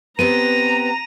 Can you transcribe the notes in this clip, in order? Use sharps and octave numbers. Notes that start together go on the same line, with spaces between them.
B3 C4 G4 B4 A#5 D#7